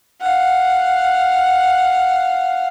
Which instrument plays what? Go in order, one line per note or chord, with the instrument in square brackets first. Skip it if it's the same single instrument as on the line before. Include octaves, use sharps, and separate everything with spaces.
[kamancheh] F5 F#5